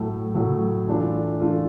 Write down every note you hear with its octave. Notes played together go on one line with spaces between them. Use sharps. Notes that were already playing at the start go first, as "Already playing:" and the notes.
Already playing: A2 F#3 A3
A2 F#3 A3
E3 A3 D4 F4
E3 A3 D4 F4